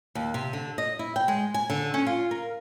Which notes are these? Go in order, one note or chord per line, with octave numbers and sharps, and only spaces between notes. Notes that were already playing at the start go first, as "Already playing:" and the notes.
D#2
C3
D3
D#5
E4
G5
G#3
G#5
D3
C#4
F4
A#4